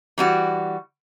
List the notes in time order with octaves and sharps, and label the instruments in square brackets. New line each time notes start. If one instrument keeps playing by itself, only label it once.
[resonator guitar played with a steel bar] E3 G3 F#4